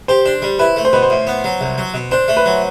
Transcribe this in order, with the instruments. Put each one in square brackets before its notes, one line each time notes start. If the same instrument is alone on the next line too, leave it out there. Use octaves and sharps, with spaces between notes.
[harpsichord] G4 [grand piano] C5
[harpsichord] D4
G3
[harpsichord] E4 [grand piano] B4
[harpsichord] A3
[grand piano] C5
[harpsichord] B2 [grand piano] B4
[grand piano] C5
[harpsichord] A2
B3
F#3
C2
F#3
B2
[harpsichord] D4 [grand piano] C5
[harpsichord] A3
[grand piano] B4
[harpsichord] F#3